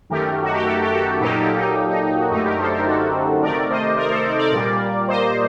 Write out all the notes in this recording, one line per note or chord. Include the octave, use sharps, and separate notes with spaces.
F#2 D#3 A3 G4 A#4
F#4
G4
F#4 A4
G4
F#4 A4
A#2 F#3 A#3 D#4 G4
A4
D#4 G4
D#4
D#4
D#4
F#4
F#2 D3 A3 D#4 G4
G4 A#4
A4 C5
G4 A#4
F#4 A4
C3 D#3 A3 A#4 D5
C5 D#5
A#4 D5
A4 C5
A#4 D5
A#4 D5
A#2 G3 A#3
C5 D#5